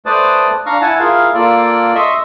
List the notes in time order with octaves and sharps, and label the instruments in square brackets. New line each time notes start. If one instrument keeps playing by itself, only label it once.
[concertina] A3 B4 C5 D5 A5 D#6
D4 F5 A#5 C#6 F6
E4 F#5 G#5 A5
E4 F4 G#4 A#4 F5
A#3 F4 A4 D5
D#5 E5 C6 C#6 D#6 E6